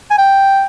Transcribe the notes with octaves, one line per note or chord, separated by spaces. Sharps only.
G#5
G5